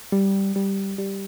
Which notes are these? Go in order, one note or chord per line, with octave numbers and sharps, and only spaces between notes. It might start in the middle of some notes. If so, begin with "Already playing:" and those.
G3
G3
G3